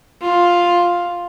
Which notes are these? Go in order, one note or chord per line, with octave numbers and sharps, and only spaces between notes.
F4